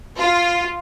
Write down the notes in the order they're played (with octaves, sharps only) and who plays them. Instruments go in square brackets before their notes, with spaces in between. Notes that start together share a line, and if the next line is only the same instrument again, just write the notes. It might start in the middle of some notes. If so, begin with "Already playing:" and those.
[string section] F4